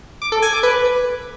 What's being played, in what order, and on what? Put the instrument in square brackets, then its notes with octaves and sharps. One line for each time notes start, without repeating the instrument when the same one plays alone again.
[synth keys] D6
A4
G#5
D6
B4